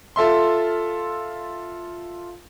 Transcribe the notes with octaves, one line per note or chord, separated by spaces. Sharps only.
F4 A4 E5 C6